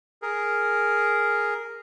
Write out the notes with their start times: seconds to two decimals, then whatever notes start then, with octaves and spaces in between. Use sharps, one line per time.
0.22 G#4 A#4